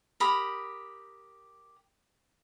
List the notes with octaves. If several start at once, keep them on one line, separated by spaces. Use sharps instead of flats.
G4 A#4 B5 D#6